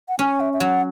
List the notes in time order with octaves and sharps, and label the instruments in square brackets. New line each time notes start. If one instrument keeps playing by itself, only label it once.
[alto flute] F#5
[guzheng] C#4 [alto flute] G#5
[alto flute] E5
E5
[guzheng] F#3 [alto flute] F#5